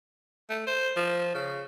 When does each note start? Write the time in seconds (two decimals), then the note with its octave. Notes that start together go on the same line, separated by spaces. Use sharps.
0.50 A3
0.67 C5
0.97 F3
1.35 C#3